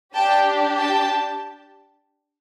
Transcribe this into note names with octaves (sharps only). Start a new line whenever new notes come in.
D4 G4 G5 A5
G5 A5